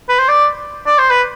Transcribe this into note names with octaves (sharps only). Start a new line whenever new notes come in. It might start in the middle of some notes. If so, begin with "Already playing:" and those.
B4
C5
D5
D5
C5
B4